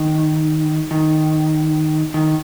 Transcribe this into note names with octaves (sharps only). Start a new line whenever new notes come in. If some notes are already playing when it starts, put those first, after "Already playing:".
Already playing: D#3
D#3
D#3